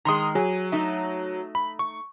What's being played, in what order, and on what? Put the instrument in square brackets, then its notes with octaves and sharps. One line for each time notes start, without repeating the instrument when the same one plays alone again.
[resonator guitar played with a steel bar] D#3 G#3 [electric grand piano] A#5 C6 D#6
[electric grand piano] F#3 [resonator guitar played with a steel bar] G#4
[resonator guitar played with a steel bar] A3 D#4 E5
[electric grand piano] B5
C#6